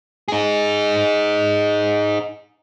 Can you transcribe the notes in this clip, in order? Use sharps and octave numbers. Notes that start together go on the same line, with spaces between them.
D#4 G#4